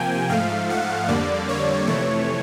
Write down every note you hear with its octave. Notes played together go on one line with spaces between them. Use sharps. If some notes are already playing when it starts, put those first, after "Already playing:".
Already playing: C3 F3 A#3 G5 G#5
G#2 F3 A3 F5
F#5
F2 D3 G3 A#3 D5
C#5
F2 C3 E3 A3 C#5